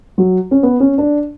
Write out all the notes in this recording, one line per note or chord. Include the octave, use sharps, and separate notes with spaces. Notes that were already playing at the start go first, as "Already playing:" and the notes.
F#3
C#4
B3
C#4
D4